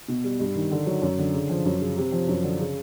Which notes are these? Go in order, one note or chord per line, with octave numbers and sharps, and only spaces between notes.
B2
G3
G2
D#3
D3
F#3
F#2
D3
C#3
F3
F#2
C#3
C3
F3
F#2
D3
C#3